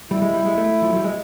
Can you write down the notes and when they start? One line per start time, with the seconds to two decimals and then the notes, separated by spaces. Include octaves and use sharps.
0.11 G3 E4
0.22 G#3
0.34 G3
0.46 G#3
0.58 A3
0.82 F3
0.90 F#3
0.96 G3
1.04 G#3